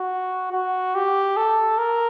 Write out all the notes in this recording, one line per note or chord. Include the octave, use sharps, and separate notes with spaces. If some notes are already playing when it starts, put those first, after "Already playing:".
Already playing: F#4
F#4
G4
A4
A#4